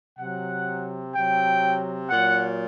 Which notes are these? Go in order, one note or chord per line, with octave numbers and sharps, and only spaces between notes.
C3 F#3 F#5
C3 F#3 G5
A#2 F#3 F#5